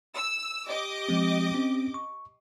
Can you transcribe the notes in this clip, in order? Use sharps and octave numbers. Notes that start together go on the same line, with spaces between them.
E6
G4 D#5 D6
F3 G#3 C4
C4 C#4
C#6